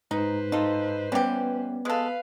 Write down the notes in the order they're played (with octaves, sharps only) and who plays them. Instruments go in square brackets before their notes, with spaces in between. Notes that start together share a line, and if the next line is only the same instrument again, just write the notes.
[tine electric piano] G#2 [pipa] D#4 [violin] B4 C5
[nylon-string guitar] D#4 [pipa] F4 A4
[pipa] E3 G4 [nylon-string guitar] G3 C#4 [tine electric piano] B3
[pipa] G#3 A4 [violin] B4 F5